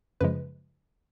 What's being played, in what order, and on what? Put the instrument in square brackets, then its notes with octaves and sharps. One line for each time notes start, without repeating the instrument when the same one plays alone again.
[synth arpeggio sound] F#2 C#3 F3 G#3 B4